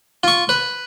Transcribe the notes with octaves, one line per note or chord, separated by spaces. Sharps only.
F4 C#6
B4